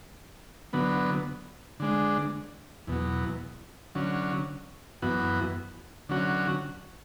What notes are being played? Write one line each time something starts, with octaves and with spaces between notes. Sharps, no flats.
D3 F#3 B3
D3 G#3 D4
E2 B2 F#3
D3 F#3 C#4
F#2 E3 B3 F#4
D3 F#3 C#4 F#4